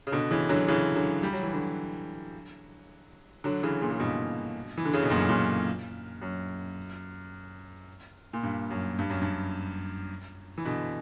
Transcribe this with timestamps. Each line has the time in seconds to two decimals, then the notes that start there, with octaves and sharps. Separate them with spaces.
0.07 C#3
0.12 B2 D3
0.31 C#3 E3
0.49 D3 F#3
0.68 C#3 E3
0.95 D3 F#3
1.23 G3
1.33 F#3
1.43 E3
1.53 D3 F#3
3.44 D3 F#3
3.63 C#3 E3
3.82 A#2 C#3
3.92 C#3
3.99 G2 B2
4.78 E3
4.85 D3
4.94 C#3
5.02 B2
5.10 F#2 A#2
5.29 F#2 A#2
6.22 F#2
8.33 A#2
8.43 G2
8.71 F#2
8.99 G2
9.10 F#2
9.22 G2
10.58 E3
10.65 B2 D3